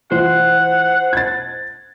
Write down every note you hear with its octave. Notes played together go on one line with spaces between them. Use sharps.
E3 F4 C5 F#5
G#6 A6